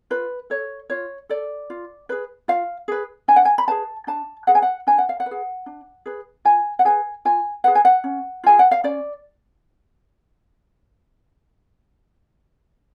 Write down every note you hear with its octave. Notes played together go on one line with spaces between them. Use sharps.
F4 B4
A4 C#5
F4 C#5
A4 D5
F4
G#4 B4
F4 F5
G#4 B4
D4 G#5
F#5
G#5
B5
G#4 B4 A5
D4 A5
G#4 B4 F#5
G#5
F#5
D4 G#5
F#5
F5
F#5
B4
G#4
D4
G#4 B4
F4 G#5
F#5
G#4 B4 G#5
F4 G#5
G#4 B4 F#5
G#5
F#5
C#4
F4 G#4 G#5
F#5
F5
C#4 D5